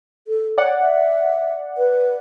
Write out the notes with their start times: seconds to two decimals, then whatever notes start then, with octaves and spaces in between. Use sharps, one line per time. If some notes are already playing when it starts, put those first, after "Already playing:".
0.27 A4
0.58 C#5 D5 F#5
0.81 E5
1.77 B4